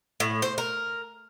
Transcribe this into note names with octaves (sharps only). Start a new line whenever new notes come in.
A2
C5
A#4